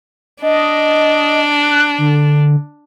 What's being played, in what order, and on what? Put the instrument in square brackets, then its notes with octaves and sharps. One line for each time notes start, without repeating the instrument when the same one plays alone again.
[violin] D4 [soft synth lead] D#5
[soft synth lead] F#6
D3